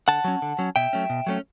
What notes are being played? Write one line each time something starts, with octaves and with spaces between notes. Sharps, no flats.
D3 F#5 A5
F#3 C#4
D3
F#3 C#4
B2 E5 G5
F#3 A3 C#4
B2
F#3 A3 C#4